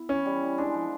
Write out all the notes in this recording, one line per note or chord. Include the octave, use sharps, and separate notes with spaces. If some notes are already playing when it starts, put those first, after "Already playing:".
Already playing: B3 E4
E3 C#4
G3
E3
G#3 D4
F3